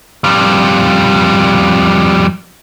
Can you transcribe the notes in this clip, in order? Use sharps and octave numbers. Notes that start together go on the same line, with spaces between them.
F2 G3